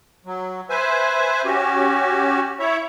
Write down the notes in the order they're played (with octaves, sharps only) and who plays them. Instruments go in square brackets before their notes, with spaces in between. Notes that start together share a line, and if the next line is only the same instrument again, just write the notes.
[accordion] F#3
B4 C5 E5 G#5
C#4 F#4 G4
E4 C#5 E5